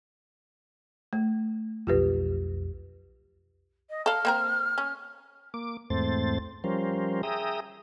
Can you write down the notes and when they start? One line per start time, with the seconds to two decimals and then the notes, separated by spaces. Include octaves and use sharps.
1.13 A3
1.87 B1 F2 F4 G4 B4
3.90 D#5
4.06 A4 F5 F6
4.25 A#3 C4 A#4
4.78 C#4
5.54 A#3 D6
5.90 E2 G#2 A3 C4 C5 A6
6.64 F3 G3 C#4 A#4 C5
7.23 G#4 E5 G5 A#5 D#6